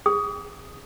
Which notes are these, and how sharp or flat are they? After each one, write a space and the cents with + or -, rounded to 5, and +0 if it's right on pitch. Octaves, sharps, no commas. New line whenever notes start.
G#4 -25 D#6 +0